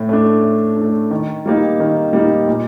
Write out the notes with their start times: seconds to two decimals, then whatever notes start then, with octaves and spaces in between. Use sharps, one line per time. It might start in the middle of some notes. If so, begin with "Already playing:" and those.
Already playing: A2
0.09 A3 D4
0.43 A2
0.77 A3 D4
1.11 D#3
1.46 G3 A#3 D#4
1.79 D#3
2.13 G3 A#3 D#4
2.47 A#2